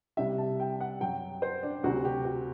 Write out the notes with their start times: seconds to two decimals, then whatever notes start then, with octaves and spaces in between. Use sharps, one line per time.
0.17 C2 C3 G3 E5
0.38 A5
0.60 G5
0.81 F#5
1.01 F#2 F#3 G5
1.42 C5
1.63 D4
1.84 D2 C3 F#3 F#4
2.05 G4
2.25 F#4